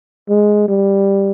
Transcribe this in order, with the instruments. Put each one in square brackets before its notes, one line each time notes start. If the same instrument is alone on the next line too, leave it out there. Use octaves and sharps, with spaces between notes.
[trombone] G#3
G3